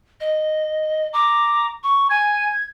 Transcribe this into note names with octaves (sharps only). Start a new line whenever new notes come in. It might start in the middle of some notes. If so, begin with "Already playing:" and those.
D#5
A#5 D6
C#6
G#5 G#6